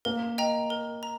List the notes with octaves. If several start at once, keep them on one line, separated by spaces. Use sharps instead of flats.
A#3 A#4
D#5 G5 A#5
A#4
A#5